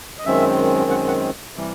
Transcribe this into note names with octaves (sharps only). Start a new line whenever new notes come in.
D#5
F#2 D#3 G#3 C4 E5
F#5
F#5
C3 E3 G3